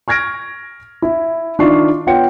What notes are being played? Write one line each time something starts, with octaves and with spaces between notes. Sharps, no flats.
C#6 F6 G#6 A#6 D7
E4
D#3 D4 E4 F4 C#6 C7
B3 F4 C#5 F#5 G5 C#7